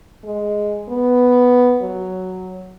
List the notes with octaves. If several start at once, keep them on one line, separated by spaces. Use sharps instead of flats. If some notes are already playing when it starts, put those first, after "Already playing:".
G#3
B3
F#3